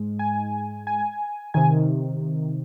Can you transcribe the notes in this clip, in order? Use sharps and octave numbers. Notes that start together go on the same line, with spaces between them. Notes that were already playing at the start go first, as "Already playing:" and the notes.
Already playing: G#2 G#3
G#5
G#5
C3 D#3 G#5